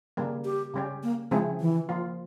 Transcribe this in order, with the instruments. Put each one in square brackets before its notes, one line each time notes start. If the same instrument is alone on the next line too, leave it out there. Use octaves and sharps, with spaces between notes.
[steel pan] C#3 G3 A#3
[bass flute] G4
[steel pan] C#3 G3 C#4 G4
[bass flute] A#3
[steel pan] C#3 F3 C4 E4 G#4 [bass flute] G#3
[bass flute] E3
[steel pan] F3 A#3 F4